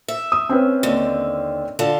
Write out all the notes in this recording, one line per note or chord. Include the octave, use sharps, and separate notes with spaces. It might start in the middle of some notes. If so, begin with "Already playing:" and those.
E5
D#6
C4 C#4 B4
D#2 D3
D3 F4 A5